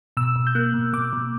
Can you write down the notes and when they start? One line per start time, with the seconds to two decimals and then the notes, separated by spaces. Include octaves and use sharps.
0.17 B2 E6
0.36 B2
0.47 G6
0.55 A#3 F#6
0.74 B2
0.93 B2 D6
1.13 B2